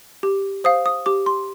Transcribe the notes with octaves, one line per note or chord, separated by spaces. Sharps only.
G4
C5 F5 D#6
D#6
G4 D6
C6